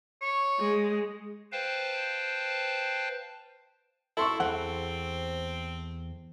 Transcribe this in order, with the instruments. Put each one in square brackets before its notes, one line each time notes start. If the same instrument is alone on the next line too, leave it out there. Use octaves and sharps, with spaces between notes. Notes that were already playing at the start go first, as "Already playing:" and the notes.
[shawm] C#5
[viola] G#3
[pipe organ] B4 C5 F5 G5 A5
[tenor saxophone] E4 [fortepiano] A4 C6 C#6
[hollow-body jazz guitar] E2 F#5 [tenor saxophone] C4